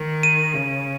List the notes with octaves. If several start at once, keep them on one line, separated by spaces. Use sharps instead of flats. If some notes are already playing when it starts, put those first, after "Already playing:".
Already playing: D#3
D#7
C#3